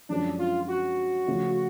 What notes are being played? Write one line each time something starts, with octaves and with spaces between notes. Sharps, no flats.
F#2 D3 F3 G#3 C#4 D4
F4
F#4
C#3 F3 A3 F4